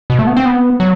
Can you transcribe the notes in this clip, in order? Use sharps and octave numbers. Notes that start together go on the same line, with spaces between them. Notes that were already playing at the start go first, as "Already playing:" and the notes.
B2
A3
B3
C4
B3
F#3